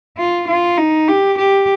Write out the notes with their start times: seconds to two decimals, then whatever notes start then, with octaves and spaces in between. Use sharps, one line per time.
0.17 F4
0.48 F4
0.78 D#4
1.08 G4
1.38 G4